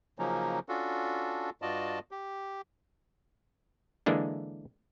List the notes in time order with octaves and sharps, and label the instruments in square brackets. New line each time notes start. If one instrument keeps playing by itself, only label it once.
[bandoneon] C#3 F3 F#3 A#3 C#4 D#4
C#4 D4 F4 F#4 A4
G2 F4 F#4 D5 D#5 A5
G4
[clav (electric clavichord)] D3 E3 G#3 A#3 D4